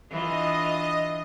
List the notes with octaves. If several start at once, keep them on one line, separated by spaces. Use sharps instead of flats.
E3 D4 F4 D#5